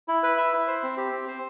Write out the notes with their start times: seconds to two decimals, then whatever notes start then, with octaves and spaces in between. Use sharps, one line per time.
0.08 E4
0.23 B4
0.37 E5
0.53 E4
0.67 C5
0.83 C4
0.97 G4
1.12 C4
1.28 C5